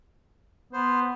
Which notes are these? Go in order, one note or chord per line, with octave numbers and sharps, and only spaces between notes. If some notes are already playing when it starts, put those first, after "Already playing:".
B3 C5